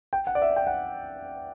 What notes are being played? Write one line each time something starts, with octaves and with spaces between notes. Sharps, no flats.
G5
F#5
D5
E5
G5
F#5